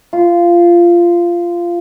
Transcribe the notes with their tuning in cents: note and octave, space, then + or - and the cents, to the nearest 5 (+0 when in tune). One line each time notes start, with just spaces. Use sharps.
F4 -15